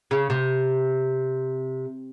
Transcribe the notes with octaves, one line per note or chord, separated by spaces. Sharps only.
C#3
C3